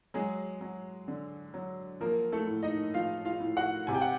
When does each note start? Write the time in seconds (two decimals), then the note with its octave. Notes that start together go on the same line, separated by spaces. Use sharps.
0.14 F#3 G#3 G#4
0.61 F#3
1.08 D3
1.54 F#3
2.01 F3 A#3 A#4
2.32 A3 A4
2.47 A2
2.63 D#4 D#5
2.94 F3 F4 F5
3.25 F4 F5
3.40 A2
3.57 F#4 F#5
3.87 C3 G#5
3.95 G5
4.01 F#5